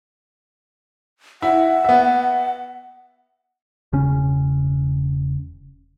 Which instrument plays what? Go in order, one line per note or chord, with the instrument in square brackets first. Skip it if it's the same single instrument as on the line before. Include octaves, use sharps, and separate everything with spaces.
[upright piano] E4 [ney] F#5
[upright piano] B3 E5
[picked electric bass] E1 C#3 C#4